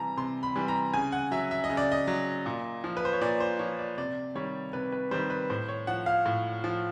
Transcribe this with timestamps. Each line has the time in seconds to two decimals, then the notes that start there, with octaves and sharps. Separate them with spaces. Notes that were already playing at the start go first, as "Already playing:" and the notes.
Already playing: C3 E3 G3 A5 A#5
0.17 C3 C6
0.43 B5
0.56 E3 G3
0.68 A#5
0.94 C#3 G#5
1.12 F#5
1.31 F#3 E5
1.51 E5
1.64 D#5
1.70 C#3
1.77 D5
1.92 D#5
2.07 F#3
2.46 A#2
2.84 F3
2.97 B4
3.05 C5
3.13 C#5
3.21 A#2 D5
3.40 C5
3.59 F3 C#5
3.79 D5
3.98 C3 D5
4.35 D#3 G3 C#5
4.73 C3 B4
4.92 B4
5.11 D#3 G3 C5
5.30 B4
5.50 A2 C5
5.69 C#5
5.87 F3 F#5
6.06 F5
6.26 A2
6.64 F3